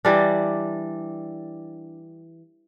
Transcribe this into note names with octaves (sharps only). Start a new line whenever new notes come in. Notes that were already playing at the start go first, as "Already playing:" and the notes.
E3 G3 D4